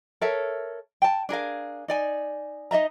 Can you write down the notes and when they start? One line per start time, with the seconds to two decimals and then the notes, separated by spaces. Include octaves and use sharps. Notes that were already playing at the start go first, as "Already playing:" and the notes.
0.21 A4 A#4 C#5 E5
1.02 G5 A5
1.29 D4 G#4 A#4 F5
1.88 D#4 D5 G#5
2.71 D#4 D#5 E5 A#5